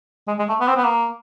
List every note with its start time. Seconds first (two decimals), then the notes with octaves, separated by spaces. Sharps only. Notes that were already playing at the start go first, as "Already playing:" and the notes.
0.27 G#3
0.39 G#3
0.49 A3
0.60 B3
0.68 C4
0.76 B3
0.84 A#3